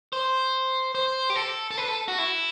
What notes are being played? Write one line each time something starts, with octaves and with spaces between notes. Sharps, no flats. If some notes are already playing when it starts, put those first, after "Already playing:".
C5
C5
G4
A4
A4
B4
A4
F#4
E4